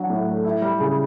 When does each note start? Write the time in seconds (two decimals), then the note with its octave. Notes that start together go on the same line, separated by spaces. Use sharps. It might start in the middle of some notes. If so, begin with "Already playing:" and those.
Already playing: F#3 D4
0.10 A2
0.28 A3
0.45 E4
0.62 G3
0.80 C#3